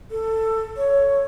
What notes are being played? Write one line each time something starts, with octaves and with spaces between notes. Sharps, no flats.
A4
C#5